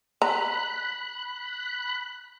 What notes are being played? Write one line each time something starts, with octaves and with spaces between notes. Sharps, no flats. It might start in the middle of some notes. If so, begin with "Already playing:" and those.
A#5 B5 F#6